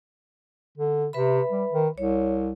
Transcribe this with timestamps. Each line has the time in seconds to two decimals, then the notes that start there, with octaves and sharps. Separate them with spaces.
0.77 D3
1.13 C3 B4 E5 B5
1.51 G3
1.72 D#3
1.98 C2 C#5